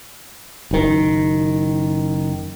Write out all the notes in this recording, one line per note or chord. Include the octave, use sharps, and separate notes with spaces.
F#1 D#3